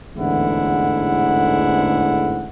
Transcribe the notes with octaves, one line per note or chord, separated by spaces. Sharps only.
A1 E2 G#2 D3 E4 F#5